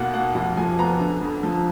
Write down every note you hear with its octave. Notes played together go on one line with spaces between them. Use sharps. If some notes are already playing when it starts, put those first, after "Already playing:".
Already playing: D#2 B2 A#3 F#5
A#3 F#5
F1 F#5
F3 G#5
B3 A#5
D3
F2
F3